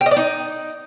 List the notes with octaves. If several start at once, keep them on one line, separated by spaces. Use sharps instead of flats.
G4
D#5
D5
D#4